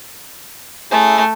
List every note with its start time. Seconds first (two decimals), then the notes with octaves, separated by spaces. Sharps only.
0.91 A3 C#4 E4 G#4